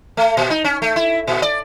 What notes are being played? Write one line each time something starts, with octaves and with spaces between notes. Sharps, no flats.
A3
A#2
D#4
C#4
A3
E4
A#2
D5